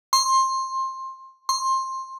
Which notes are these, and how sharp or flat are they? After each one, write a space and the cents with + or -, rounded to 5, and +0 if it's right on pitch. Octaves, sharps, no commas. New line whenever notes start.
C6 +20
C6 +20